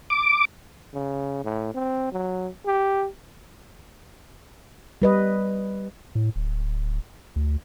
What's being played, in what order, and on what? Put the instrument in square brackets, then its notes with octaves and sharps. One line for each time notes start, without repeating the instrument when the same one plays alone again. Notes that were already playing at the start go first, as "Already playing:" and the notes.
[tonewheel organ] D6
[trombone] C#3
A2
C4
F#3
G4
[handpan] G3 B4 D#5
[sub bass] A2
D1
D2